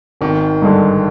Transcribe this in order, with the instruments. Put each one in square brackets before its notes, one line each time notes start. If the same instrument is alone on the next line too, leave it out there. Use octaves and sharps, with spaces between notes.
[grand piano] G#1 [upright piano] D#3
[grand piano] G2 D3 G#3